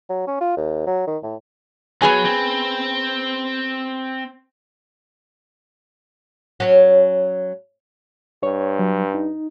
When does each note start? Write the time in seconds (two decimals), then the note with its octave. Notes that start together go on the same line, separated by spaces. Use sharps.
0.09 F#3
0.27 C#4
0.41 F4
0.57 D#2
0.86 F#3
1.07 D#3
1.23 A2
2.02 F#3 B3 G#4 G#5
2.25 C4
6.60 F#3 C#4
8.43 G2 C#5
8.79 F#3
9.14 D#4